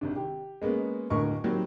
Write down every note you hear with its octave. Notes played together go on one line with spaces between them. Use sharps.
G#1 C3 D4
G4
G#3 A#3 B3 C#4
D1 A2 D3 A#4 D#5 C#6
D#3 F#3 G3 A#3 C4